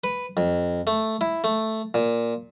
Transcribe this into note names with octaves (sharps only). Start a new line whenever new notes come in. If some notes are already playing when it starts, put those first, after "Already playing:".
B4
F2
A3
E4
A3
A#2